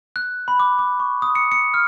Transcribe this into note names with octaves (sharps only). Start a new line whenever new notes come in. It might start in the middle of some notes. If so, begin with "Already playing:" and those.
F#6
B5
D6
D6
C#6
D#6
C#7
C#7
F6